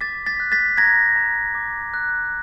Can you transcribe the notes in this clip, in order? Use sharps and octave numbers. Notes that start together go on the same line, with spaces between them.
D6 A6 B6
A6 B6
F#6
A6 B6
A#5 G#6 A#6
A#5
D6
F#6